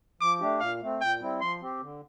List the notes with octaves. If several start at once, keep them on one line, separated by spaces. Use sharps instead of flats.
F3 D6
A3 D4 G4
A#2 F5
A3 C4
A#2 G5
G3 C4 E4
F3 C6
C4 G4
D3